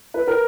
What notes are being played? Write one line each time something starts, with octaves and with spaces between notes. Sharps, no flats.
B4
A#4